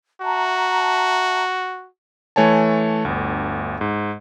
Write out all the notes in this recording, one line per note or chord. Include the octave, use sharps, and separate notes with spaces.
F#4 E5 A5 A#5
E3 A3 C#5 G#5 A5
G1 D2
G#2